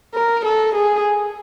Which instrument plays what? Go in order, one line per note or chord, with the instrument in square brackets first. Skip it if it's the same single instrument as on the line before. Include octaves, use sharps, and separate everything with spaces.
[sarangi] A#4
A4
G#4